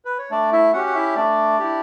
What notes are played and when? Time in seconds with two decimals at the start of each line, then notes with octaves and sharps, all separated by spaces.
0.05 B4
0.18 C#5
0.31 A3 D4 D5
0.52 E4 E5
0.73 C#4 F#4 G4 F#5
0.86 F#5
0.95 E4 E5
1.16 A3 D4 D5
1.59 E4 G4